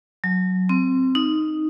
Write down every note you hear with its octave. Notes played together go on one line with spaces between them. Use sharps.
F#3
C4
D#4